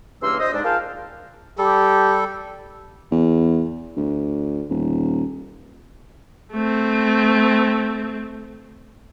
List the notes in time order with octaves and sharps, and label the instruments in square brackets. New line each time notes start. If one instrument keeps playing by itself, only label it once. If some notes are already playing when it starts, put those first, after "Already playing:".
[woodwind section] G2 C#3 E3 A#3 C6 E6
D2 C5 D#5
G#2 D4
F4 G#4 A#4 F5 G5 A5
[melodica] G3 A4 [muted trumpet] G4
[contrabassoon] E2
D2
D#1
[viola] A3 C4